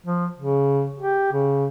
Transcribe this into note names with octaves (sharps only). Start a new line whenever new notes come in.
F3
C#3
G4
C#3